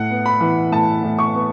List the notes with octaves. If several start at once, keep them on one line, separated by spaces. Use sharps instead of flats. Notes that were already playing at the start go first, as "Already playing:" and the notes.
Already playing: A2 F#5
B3
B5
E3
A2 A5
A2
C#6
B3